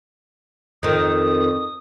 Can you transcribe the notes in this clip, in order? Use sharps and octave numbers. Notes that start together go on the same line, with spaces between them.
F2 D#3 D#6